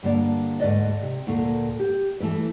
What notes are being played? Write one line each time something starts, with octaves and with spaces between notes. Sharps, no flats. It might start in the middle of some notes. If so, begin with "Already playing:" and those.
G2 D3 A#3 D5 A5
D2 G#2 F#3 B4 D5 D#5
C3
D2 A#2 A#4
G4
E3 A3 E4 B4